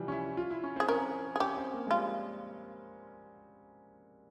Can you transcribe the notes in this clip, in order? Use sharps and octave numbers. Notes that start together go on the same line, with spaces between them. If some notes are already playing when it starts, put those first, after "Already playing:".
Already playing: C3 E3 F3 G3
C#4
E4
F4
E4
C#4
C4
G#4
C#4 A#4
G#4
C#4 G4
C4
A#3
G#3
G3 F4